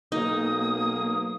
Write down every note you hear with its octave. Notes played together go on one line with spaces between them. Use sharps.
B1 A#3 D#4 D#6